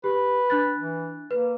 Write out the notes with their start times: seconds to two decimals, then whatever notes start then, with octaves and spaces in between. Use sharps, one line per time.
0.04 G4 B4
0.50 D4 F#6 A6
0.76 E3
1.31 A#3 B4